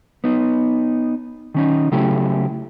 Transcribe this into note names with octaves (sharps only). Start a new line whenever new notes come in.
B3 D#4
D#3 C#4 D#4
C#3 F#3 A3 E4 G4